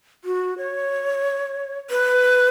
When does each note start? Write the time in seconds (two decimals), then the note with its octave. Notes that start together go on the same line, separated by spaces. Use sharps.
0.24 F#4
0.58 C#5
1.90 B4